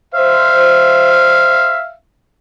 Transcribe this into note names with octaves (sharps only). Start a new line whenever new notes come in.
C5 E5 F5